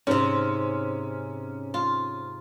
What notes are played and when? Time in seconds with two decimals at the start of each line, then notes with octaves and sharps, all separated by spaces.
0.07 G#2 C3 C#4
1.74 F4